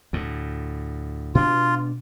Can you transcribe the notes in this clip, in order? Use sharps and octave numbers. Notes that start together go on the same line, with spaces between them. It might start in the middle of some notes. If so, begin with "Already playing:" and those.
D2 A2
B2 D4 F4